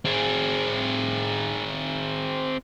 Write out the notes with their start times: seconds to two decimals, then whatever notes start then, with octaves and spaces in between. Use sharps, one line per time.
0.05 C4 G#4